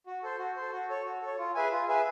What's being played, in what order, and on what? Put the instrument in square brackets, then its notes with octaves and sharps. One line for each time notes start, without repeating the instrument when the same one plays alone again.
[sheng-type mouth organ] F#4
A4 C5
F#4
A4 C5
F#4
A4 C#5
F#4
A4 C#5
F4
G#4 B4 E5 G#5
F4
G#4 B4 E5 G#5